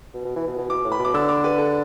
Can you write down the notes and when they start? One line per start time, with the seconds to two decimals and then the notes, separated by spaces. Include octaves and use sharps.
0.14 B2
0.25 B2
0.36 E3
0.47 B2
0.58 B2
0.69 B2 D6
0.84 A2
0.92 B5
0.99 B2
1.05 D6
1.14 D3 E6
1.29 D6
1.44 B4
1.58 A4